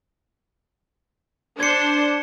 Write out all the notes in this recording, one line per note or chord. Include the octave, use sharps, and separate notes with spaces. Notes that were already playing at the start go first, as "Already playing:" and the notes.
D4 C5 G#6 C#7